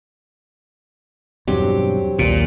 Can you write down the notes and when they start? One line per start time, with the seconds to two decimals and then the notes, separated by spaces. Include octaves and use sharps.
1.47 E2 G2 B2 F#3 C4 G4
2.19 A#1 D#2 A#2